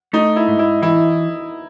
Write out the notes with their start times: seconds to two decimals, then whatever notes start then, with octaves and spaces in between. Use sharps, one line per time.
0.13 A3 D#4
0.36 E4
0.48 G#2
0.59 E4
0.82 E3 E4